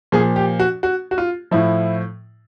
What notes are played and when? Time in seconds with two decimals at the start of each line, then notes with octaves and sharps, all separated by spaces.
0.12 A#2 F3 G#4
0.36 G4
0.60 F#4
0.83 F#4
1.11 F#4
1.18 F4
1.51 A2 F3 E4